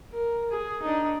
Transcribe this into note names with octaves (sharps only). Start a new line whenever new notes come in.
A#4
G#4
D4 D#4